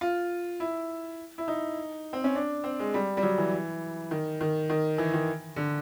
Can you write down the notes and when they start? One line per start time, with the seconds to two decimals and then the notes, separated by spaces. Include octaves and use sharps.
0.01 F4
0.60 E4
1.38 E4
1.48 D#4
2.13 C4
2.24 C#4
2.35 D4
2.64 C4
2.80 G#3
2.94 G3
3.17 G3
3.23 F#3
3.38 E3
4.11 D#3
4.41 D#3
4.69 D#3
4.98 E3
5.13 D#3
5.56 D3